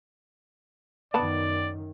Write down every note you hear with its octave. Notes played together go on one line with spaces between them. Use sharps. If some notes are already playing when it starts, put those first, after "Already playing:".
F#2 D#3 B3 B4 D5 A5